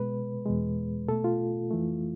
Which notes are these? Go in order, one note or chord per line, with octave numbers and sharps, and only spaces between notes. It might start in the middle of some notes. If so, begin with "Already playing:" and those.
Already playing: B2 G#3 B4
E2 B2 G#3
B2 A3 A4
F4
F2 E3 A3